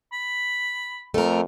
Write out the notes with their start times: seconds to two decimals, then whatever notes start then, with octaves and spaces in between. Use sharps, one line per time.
0.13 B5
1.14 F2 A3 A#4